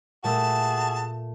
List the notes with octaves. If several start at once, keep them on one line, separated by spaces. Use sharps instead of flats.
A#2 A3 F#4 G#4 E5 A5 E6